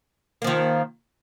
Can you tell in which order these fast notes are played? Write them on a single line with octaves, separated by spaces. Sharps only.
A#3 F3 D#3